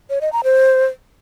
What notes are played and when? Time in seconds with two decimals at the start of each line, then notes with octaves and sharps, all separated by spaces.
0.10 C#5
0.21 D#5
0.33 A#5
0.44 C5